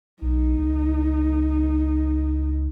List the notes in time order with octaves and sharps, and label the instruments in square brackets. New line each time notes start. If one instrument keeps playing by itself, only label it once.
[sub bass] B1 [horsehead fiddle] D#4
[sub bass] C#2